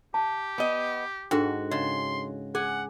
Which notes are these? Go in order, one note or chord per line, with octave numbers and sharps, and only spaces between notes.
G4 A5
B3 D#5
G#2 D4 F#4 A4 G5
C#3 D#5 C6
G#4 F#5 G#5